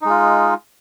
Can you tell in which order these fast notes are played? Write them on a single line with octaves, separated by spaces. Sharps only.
D#4 G#3 F4